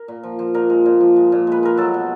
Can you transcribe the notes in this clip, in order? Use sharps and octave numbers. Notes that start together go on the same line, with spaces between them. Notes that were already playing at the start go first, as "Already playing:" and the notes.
Already playing: A#4
A#2
F3
F3
A#2 A#4
G#3
A#2
F3
G#3
A#2
G#3 B4
G#3 A#4
F#3 A4
B2